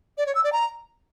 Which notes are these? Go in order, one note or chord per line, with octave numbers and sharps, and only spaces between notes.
D5
C#5
E6
D5
A#5